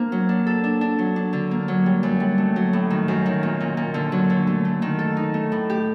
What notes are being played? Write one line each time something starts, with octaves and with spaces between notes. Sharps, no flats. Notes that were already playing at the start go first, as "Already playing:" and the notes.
Already playing: A#3 C4 D4
F#3
D4
A4
D4
D4
F#3
D4
D3
A#3
F#3
G3
F#2
G3
A3
F#3
A2
D#3
F#2
D#3
A#2
A#2
A#2
D3
F#3
D3
A3
A3
D#3
A4
D#4
A3
A2
G4